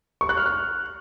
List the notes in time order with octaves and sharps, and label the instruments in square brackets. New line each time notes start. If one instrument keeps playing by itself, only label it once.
[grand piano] C#6
F#6
F6
F#6